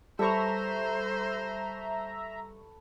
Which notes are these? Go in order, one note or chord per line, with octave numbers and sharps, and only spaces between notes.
G3 A4 B4 C5 E5 A#5 C#6